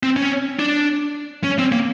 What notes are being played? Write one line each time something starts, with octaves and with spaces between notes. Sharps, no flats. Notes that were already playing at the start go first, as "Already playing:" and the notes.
C4
C#4
D4
C#4
C4
A#3